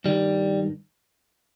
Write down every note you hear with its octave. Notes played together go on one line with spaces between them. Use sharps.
G2 D#3 G3